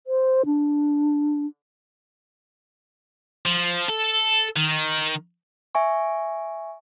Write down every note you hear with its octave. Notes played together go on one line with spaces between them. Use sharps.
C5
D4
F3
A4
D#3
E5 G#5 C#6